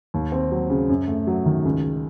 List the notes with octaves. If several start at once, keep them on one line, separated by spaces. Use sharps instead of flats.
D#2
C4
F#3
C#3
F#2
A3
F#3
D#3
C#2